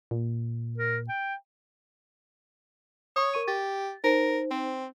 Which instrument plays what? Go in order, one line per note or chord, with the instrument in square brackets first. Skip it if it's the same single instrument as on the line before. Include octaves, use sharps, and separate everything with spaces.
[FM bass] A#2
[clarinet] A#4
G5
[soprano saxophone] C#5 [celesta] C#6 D#6
[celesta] A#4 C#6 D#7
[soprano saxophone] G4 [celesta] A6
[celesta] D#4 C5 [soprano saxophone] A#4
[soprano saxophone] C4